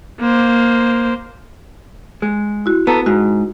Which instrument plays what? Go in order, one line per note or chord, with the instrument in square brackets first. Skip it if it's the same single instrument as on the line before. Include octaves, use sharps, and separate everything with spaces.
[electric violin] A#3 C5
[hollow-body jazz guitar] G#3
[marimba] E4 F#4
[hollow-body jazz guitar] B3 A4 [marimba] A#5
[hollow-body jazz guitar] G#2 [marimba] F#4